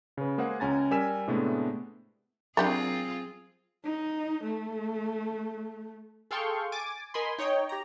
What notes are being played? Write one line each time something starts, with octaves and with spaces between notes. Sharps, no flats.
C#3 B4
G#3 A#3 G#4 C5 F#5
C#2 C#4 G#5 A#5 A6
G3 A#4 G#5 E6 B6 E7
A2 C3 G#3 A3 B3 D4
F#3 C4 D4 F4 G4 G#4 A#4 C#6
D#4
A3
G#4 A4 F5 G5 C6 C#6
G#5 D6 A6
A#4 D#5 G#5 B5 C6
D#4 C#5 D#5 G5
G4 A#5